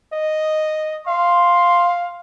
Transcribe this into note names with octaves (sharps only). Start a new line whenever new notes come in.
D#5
F5 C6